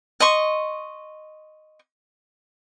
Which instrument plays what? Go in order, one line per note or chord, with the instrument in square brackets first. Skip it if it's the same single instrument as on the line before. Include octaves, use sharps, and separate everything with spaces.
[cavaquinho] D#5 C6 C#6